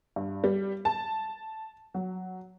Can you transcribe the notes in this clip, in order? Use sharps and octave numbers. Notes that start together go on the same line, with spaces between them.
G2
G3
A5
F#3